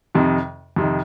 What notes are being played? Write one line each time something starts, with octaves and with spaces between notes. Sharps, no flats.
F2 C3 D#3
F2 C3 D#3